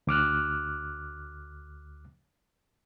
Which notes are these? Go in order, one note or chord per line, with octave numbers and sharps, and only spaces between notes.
D2 D6 F6 F#6